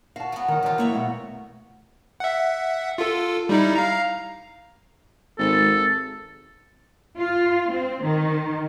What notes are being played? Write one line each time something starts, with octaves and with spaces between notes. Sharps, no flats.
F#4 F5 A5
F#3 B3
D#3 F#5
D#3 E3 F#3 F4 G4
A#3 E4 F#4 C#5 E5
B2 A3 F#5
E5 F#5
F4 A4
G3 D#4 E4
F5 A#5
G#1 A4
F4
C4
D#3